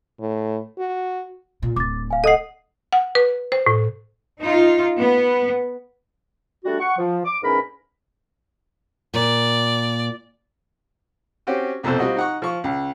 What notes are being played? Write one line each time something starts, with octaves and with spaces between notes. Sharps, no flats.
A2
F#4
A#2
D1 D6 A6
F5 G#5
A4 D#5 F#5 D#6 C7
F#5
B4
C5
A2
D#4 F4
B3
G3 A3 D4 F#4
F#5 C#6
F3
D6
E2 G#2 C#4 D#4 A#4 B5
A#2 D5
C4 C#4 F#4 G4
C2 F2 B2 A4 C5
G3 C4 F4 F#4 D#5
D#4 F#5 C#6
F3 C#6
C#2